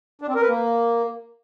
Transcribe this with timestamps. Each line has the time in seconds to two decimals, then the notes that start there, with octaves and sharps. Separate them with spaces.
0.22 D4
0.28 C4
0.35 A#4
0.42 B4
0.49 A#3